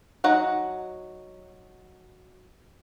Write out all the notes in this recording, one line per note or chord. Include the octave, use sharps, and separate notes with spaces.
F#3 D#4 F#5